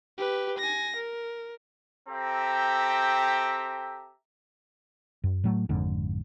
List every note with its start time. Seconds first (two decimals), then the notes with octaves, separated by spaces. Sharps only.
0.18 G4 B4
0.58 G#5 A#6
0.96 A#4
2.09 C4 G4 A4 E5 G5 A#5
5.24 F#2
5.44 A2 F#3 A3
5.69 G#1 F2 G#2 D3